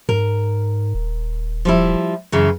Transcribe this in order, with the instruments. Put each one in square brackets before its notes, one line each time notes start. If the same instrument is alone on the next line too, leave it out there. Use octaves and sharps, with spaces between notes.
[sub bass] G#2 [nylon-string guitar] A#4
[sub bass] D#1
[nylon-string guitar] F3 G3 E4
F#2 C#3 E3